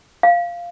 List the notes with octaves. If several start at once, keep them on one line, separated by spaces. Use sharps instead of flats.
F5